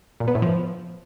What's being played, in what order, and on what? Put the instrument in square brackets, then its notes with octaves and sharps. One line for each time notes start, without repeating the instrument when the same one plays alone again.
[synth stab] A#2
B3
A2
F3